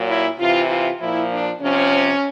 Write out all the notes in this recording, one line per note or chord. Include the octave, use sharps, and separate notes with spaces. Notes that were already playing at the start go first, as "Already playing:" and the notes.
Already playing: A#2 F#3
E4
C3 E3 F4
F4
A#2 F3 E4
D4
C3 F3 C#4